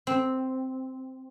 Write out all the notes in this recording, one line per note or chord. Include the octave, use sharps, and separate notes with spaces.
C4